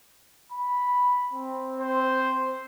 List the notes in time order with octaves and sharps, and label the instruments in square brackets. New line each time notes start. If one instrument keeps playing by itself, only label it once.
[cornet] B5
C4
[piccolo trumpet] C5